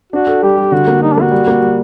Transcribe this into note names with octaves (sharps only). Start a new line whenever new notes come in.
D4 F#4
A4
G3 G4
G3
D3 F#4
A#3
G3 D#4
D4
A#3 F#4
G3
A#3
G3